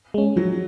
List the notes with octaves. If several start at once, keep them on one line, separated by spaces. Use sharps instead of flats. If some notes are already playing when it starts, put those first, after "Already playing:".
G#3 C#4
F3 F#3